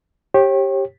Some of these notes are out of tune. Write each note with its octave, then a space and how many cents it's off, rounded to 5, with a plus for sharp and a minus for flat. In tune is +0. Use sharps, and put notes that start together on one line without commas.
G4 +0 C#5 -40